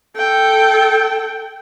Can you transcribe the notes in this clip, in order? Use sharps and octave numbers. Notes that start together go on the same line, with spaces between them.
A4 G5